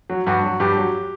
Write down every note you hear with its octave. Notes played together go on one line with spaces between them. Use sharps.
F#3
G2 F#4
F#3
G2 G4
F#3